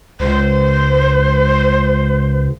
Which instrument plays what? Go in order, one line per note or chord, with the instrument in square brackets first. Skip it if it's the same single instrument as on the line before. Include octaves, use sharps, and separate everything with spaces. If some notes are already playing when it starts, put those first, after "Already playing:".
[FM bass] C#2 [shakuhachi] C5